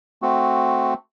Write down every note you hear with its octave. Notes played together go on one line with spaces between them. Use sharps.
A3 C4 F#4